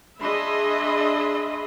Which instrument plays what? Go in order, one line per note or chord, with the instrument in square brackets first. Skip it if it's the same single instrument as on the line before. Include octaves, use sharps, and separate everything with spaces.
[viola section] D4 G#4 D#5 E5 B5 C6